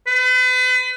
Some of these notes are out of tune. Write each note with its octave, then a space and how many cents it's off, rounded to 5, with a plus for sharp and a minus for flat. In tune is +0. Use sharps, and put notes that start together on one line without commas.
B4 +40